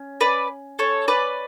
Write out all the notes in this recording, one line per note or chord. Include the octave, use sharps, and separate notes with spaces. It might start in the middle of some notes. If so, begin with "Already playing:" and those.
Already playing: C#4
B4 D5
A4 C#5
B4 D5